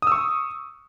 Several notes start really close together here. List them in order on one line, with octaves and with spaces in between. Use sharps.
D#6 E6 C#6